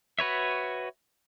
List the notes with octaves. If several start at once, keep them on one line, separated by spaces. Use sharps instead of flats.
F#4 B4 C#5 E5